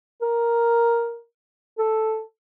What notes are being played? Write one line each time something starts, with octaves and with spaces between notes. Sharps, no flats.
A#4
A4